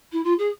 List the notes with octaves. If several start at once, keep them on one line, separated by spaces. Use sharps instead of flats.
E4
F4
G#4